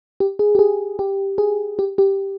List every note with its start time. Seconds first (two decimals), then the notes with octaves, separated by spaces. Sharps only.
0.20 G4
0.39 G#4
0.55 G4
0.59 G#4
0.99 G4
1.38 G#4
1.79 G4
1.98 G4